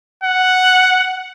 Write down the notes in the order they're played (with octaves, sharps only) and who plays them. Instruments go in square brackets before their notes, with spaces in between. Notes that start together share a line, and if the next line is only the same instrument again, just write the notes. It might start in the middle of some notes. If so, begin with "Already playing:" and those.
[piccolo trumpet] F#5